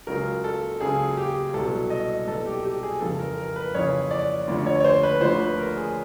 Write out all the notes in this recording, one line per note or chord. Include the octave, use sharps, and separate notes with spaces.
C#2 C#3 F#3 A#4
A4
C#2 C#3 F#3 G#4
G4
C2 B2 F#3 A4
D#5
C2 B2 F#3 A4
G4
G4
G#4
F2 C#3 E3 A4
A#4
A#4
B4
F2 C#3 E3 C#5
D5
D2 D3 F3
C#5
C#5
C5
B4
D2 D3 F3 C5
B4
A#4
G#4